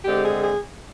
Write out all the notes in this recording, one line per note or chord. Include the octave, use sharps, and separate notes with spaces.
D3 G#3 C4 G4
G#4
G#4